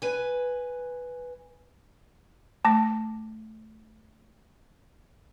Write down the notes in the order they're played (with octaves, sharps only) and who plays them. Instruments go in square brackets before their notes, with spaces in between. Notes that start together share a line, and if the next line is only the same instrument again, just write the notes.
[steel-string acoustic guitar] B4 G#5
[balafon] A3 [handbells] A5 D6 A#6